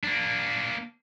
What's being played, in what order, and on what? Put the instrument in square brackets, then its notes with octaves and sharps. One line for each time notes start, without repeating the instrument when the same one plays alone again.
[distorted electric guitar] A#3 D4